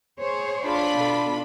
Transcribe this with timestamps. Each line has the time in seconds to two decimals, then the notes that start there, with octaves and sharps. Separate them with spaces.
0.20 G#4 C5 C#5
0.63 D4 F4 B5
0.94 B2 A4